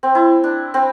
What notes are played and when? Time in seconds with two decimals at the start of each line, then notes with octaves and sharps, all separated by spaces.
0.03 C4
0.15 E4
0.44 D4
0.74 C4